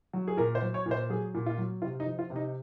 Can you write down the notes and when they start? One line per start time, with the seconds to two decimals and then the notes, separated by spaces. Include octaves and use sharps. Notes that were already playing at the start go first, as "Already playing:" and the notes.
0.13 F#3
0.28 G#4
0.37 A#2 A#4
0.55 C5
0.62 F#3
0.74 C#5
0.86 A#2
0.91 C5
1.10 F#3 G#4
1.34 A#2
1.46 F4
1.58 F#3
1.82 C3 F4
2.00 D#4
2.06 F3
2.19 F4
2.30 C3
2.36 D#4